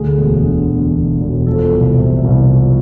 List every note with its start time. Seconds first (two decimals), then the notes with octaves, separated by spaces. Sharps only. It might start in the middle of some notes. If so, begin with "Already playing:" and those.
Already playing: D2 G#4
0.17 E1
0.44 D3
0.70 E1
0.95 E1
1.20 E1
1.47 F3 A4
1.73 C2
1.98 C3
2.24 C2
2.49 F3